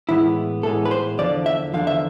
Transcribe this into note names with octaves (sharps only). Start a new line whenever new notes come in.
A2 E3 G#3 B3 E4
A2 E3 G#3 B3 A4
B4
C5
E2 D3 F3 D5
E5
E2 D3 F3 F5
E5